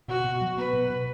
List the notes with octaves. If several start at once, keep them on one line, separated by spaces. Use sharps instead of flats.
B2 F#4
B2
F#3
B3 B4
B2
B2